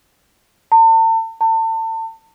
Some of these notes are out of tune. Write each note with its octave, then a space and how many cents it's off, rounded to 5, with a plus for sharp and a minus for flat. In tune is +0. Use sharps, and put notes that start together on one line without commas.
A5 +40
A5 +35